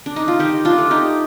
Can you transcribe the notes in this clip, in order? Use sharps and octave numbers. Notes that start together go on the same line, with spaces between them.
D4
D#4
F4
D#3 D#4 G4
D4 F4
A3
D#4 G4